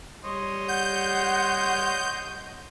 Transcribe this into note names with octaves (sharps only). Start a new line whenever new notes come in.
G3 C#5 D#5 C6
F#5 G6